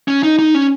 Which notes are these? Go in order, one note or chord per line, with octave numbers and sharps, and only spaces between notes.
C#4
D#4
D#4
C#4